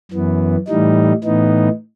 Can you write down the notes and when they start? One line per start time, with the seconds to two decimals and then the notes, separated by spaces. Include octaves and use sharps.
0.11 F#2 E3 B3
0.68 A2 E3 G3 D#4
1.24 A2 E3 B3 D#4